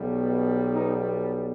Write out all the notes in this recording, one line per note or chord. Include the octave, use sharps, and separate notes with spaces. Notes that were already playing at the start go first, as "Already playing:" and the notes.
Already playing: B1 B2 G3
B3 D#4